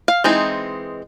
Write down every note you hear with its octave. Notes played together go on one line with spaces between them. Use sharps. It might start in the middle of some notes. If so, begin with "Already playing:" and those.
F5
E3 G#3 C4 D#4